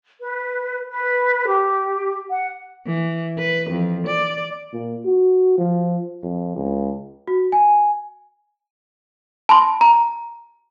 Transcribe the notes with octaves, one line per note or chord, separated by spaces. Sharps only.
B4
B4
G4
F#5
E3
B4
F2
D5
A#2
F#4
F3
F2
C#2
F#4
G#5
A5 B5 C6
A#5